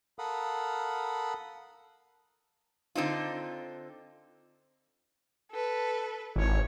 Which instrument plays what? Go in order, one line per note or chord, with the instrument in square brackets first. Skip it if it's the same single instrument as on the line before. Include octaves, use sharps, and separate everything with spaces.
[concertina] A4 A#4 F5 F#5 B5 D#6
[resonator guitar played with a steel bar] D3 C4 D#4 F4
[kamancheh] A4 B4
[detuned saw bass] G#1 [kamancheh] E4 C#5